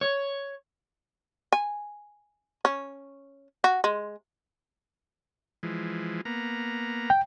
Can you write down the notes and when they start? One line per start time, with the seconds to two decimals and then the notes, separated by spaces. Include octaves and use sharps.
0.01 C#5
1.52 G#5
2.65 C#4
3.64 F#4
3.84 G#3
5.63 E3 F3 G#3
6.25 A#3 B3 A#5
7.10 G5